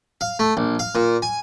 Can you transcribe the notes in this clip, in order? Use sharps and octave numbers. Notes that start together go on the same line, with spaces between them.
F5
A3
A#1
F5
A#2
G#5